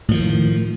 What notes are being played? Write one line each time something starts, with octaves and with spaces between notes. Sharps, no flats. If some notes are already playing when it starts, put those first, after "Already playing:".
A2 D#3 F3